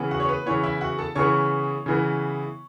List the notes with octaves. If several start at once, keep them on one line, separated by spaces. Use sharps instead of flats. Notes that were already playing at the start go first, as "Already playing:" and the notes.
Already playing: C#3 E3 B3
F#4 F#5
C#5
B4
C#3 E3 B3 C#5
E4 E5
F#4 F#5
A4 A5
C#3 E3 B3 C#5 C#6
C#3 E3 B3